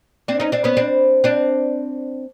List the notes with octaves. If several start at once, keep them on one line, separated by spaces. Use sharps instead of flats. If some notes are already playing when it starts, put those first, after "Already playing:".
C4 D4
C#4 D#4
C4 D4
B3 C#4
C4 D4
C4 D4